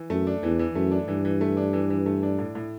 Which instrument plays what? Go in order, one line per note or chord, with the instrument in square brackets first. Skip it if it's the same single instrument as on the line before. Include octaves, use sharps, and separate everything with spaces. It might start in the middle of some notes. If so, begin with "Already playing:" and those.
Already playing: [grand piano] E3
[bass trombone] F#2 [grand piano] A3
[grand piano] D4
[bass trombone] E2 [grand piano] E3
[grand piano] E3
[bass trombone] F#2 [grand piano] A3
[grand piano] D4
[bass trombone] G2 [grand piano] E3
[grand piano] E3
A3
D4
E3
E3
A3
D4
A2
A2